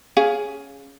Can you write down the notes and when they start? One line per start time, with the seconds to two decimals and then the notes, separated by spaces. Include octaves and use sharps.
0.17 C#4 G#4 F5